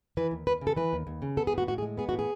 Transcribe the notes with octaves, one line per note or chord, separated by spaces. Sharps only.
E3 B4
D#2
D#2 B4
C#3
A4
E3 B4
D#2
D#2
C#3
B3 A4
G#4
A2 F#4
A2 F#4
G#4
G#3
B3 G#4
F#4
A2
G#4